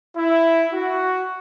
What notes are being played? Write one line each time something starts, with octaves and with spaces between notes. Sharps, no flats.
E4
F#4